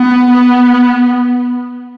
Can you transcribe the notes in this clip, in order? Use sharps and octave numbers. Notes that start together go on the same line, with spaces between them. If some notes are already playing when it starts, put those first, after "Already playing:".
Already playing: B3
B3